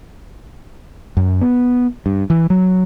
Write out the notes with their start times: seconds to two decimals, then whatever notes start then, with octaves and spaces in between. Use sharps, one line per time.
1.17 F#2
1.41 B3
2.06 G2
2.30 E3
2.50 F#3